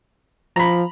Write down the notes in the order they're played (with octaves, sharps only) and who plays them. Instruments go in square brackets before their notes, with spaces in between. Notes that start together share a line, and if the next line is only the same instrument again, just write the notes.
[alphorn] F3 [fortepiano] A#5 B5